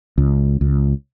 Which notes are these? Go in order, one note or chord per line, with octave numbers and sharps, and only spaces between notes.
C#2
C#2